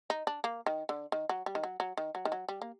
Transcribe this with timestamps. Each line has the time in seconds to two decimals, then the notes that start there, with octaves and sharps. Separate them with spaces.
0.10 D#4
0.27 D4
0.44 A#3
0.66 D#3
0.89 D3
1.12 D#3
1.29 F#3
1.46 G3
1.55 D#3
1.63 F#3
1.80 F#3
1.97 D#3
2.15 F#3
2.25 D#3
2.32 F#3
2.49 G3
2.62 A#3